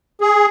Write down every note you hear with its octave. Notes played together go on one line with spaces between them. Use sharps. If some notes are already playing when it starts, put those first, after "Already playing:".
G#4